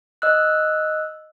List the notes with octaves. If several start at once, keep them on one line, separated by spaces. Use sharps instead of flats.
D#5 E6 F#6